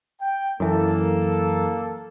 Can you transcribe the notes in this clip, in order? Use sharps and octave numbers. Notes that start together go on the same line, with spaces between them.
G5
F#2 E3 A#3 A4